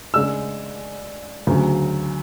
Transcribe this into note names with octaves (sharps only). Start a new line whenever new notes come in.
C#3 G#3 D4 E6
D2 C#3 F#3